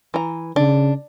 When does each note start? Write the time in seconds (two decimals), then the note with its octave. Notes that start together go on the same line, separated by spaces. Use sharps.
0.14 E3 A#5
0.56 C#3 D4